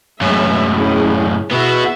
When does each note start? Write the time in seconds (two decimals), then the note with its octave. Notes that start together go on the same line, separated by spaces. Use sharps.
0.21 F#2 A2 G#3 B4 E5
0.77 C#4 E4 G#4
1.51 E3 B3 F#4 G#4 E5